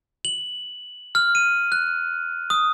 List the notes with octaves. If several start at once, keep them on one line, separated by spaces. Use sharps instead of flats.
F#7
F6
D#7
F#6
D#6